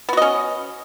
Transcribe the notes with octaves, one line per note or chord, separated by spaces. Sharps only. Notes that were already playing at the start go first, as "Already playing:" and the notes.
B3 C#4 F#4 D#5